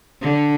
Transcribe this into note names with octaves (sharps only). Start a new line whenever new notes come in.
D3